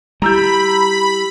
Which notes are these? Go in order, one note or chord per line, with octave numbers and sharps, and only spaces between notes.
G3 E4 G4 A#5 B5 E6 G6